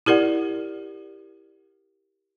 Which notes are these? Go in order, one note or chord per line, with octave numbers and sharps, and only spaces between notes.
E4 G4 A#4 D5 F#5